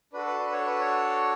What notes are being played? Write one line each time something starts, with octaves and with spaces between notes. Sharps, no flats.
D4 F#4 A4 B4
B4
B4
C#5
B4
C#5